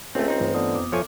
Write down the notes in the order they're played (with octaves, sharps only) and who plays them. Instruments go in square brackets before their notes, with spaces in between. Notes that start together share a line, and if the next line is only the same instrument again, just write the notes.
[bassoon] C#2 [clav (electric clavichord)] A3 C4 [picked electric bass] C#4
[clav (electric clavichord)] C4 D#4
[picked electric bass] G2 E3 A3 [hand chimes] F4 B4 C5
[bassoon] D3 [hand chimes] B3 D#6
[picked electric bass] E1 F2 [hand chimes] D6
[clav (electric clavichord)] F3 C#5 G#5 [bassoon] A3